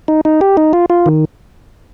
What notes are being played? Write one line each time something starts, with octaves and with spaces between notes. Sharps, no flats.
D#4
D#4
G4
D#4
F4
F4
D#3